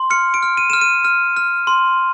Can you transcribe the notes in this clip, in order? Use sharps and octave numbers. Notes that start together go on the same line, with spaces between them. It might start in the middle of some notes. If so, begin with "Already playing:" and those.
Already playing: C6
F6 C#7
D7
F6
D#7
F6 E7
D#7
F6
F6
C6